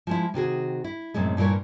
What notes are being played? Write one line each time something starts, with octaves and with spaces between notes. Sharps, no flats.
F3 G#3 E4
C3 D#3 F#4 G#4
E4
F#2 A2 C3 G#3
G2 A#2 E3 A#4 C#5